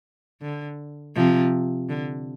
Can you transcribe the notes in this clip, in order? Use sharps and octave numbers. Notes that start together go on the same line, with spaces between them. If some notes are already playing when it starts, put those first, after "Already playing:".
D3
C3 F3
D3